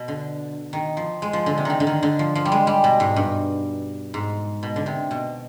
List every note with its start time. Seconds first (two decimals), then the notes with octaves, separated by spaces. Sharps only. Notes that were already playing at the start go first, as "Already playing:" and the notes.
Already playing: B2
0.08 D3
0.73 D#3
0.97 F3
1.22 G#3
1.33 F3
1.46 D3
1.58 C3
1.65 D3 D#3
1.80 D3
1.87 D#3
2.03 D3
2.19 F3
2.35 F3
2.45 G3
2.52 G#3
2.67 G3
2.84 B2
3.00 G#2
3.16 G2
4.14 G#2
4.63 B2
4.76 D3
4.86 C3
5.11 B2